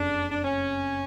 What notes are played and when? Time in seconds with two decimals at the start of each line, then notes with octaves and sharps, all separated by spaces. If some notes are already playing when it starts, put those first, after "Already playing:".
Already playing: F#1 F2 C#3 D4
0.31 D4
0.44 C#4